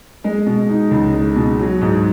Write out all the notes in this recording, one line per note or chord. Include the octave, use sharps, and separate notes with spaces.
G#3
B2
D#4
C#2
G#3
B2
F#3
G#2